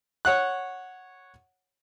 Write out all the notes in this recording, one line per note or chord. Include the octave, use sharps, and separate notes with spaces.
C#5 F#5 F#6